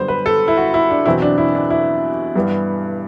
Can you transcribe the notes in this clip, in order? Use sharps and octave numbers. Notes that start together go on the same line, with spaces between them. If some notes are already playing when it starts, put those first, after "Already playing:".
Already playing: F#2 D3 G3 B3 C5
B4
A4
E4
F#4
E4
D4
E2 B2 F#3 C4 E4
D4
E4
D4
E4
G2 E3 G3 B3